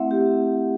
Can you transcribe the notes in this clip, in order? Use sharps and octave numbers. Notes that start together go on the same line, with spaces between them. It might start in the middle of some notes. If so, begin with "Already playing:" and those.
Already playing: A3 C4 E4 E5 F#5
G4